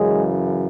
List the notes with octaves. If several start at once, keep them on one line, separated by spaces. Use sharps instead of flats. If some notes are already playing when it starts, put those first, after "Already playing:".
Already playing: F#2 C#3 E3 G#3